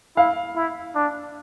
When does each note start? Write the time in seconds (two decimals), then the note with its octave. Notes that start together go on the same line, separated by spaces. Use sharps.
0.17 E4 F5
0.55 E4
0.95 D4